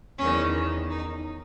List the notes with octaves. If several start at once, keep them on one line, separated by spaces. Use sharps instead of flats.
E2 D#3 C#4
D#4